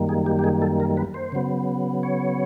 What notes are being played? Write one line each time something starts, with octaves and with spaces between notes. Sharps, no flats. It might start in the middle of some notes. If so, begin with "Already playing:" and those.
Already playing: F#2 D#3 G3 A#3
G#4
G4
G4
G#4
A4
A#4
B4
C5
C#3 F#3 B3
C#5